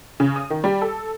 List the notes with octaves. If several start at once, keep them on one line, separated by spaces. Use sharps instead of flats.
C#3
D#6
D#3
G3
A4